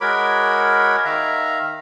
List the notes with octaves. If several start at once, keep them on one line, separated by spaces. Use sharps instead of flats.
G#3 F#4 A#4 C#5 B5 D6
D#3 E5 F5 A#5